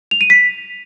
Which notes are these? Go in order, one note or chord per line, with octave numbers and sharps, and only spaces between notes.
F7
D#7
B6